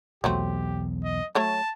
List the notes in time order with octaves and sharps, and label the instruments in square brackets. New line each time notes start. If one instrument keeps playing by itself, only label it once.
[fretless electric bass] B1 E2 [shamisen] F#3 A3 C4 [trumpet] G4
[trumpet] D#5
[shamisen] F#3 A3 C#5 [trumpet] A5